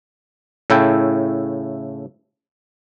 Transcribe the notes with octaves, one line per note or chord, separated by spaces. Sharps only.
A2 C#3 A3 E4 A4 G5